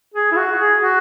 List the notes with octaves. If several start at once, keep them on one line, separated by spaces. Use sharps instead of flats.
G#4
E4
F#4
G#4
F#4